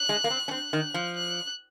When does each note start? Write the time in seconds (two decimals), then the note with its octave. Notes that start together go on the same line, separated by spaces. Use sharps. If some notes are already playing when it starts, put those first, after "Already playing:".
Already playing: F#6
0.09 G#3
0.24 A#3
0.30 C4
0.48 C#4
0.51 C4 F#6
0.73 D#3
0.94 F3
1.16 F#6